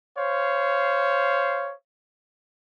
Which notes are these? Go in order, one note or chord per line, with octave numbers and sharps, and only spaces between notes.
C5 C#5 F5